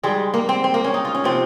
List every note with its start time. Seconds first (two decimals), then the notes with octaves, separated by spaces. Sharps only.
0.03 G#2 G3 G#3
0.34 A#3
0.49 C4
0.64 C4
0.74 A#3
0.84 C#4
0.94 D#4
1.05 F4
1.15 C#4
1.24 C3 F3 C4